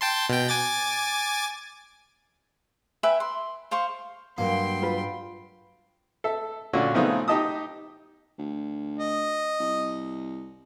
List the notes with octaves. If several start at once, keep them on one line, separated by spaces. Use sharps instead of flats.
G5 A5 C6
B2 G5
G#5 D6 A6
B4 E5 G5 G#5
C6
C5 F5 C6 C#6
G2 F#3 A#3 G5 C6
F4 B4
A4 E5
A#2 D3 C#4 F#4
C#3 F3 A3 B3 C4 D#4
D#4 G4 D#5 A5 D#6
D2
D#5
C2